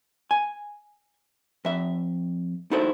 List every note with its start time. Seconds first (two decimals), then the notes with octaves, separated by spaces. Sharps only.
0.31 G#5
1.65 F2 E5
2.71 D#4 E4 F#4 A4 C5